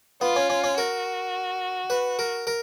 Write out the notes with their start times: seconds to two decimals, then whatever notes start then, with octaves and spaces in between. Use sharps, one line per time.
0.21 B3 F4
0.36 C#4
0.50 C#4
0.64 C#4
0.78 F#4 A#4
1.90 B4
2.19 A#4
2.47 A#4